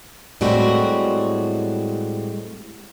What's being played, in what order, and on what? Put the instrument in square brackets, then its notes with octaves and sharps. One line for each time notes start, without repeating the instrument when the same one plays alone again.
[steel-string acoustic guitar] A2 G3 G#3 C4 F#4